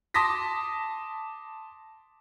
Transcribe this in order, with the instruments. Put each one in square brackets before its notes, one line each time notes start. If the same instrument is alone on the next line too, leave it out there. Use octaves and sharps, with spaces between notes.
[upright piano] A5 C6 D6 D#6 A#6 B6